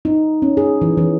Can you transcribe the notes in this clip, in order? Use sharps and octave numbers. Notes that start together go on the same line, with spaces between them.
D#4
C#4
G#4
E3
E3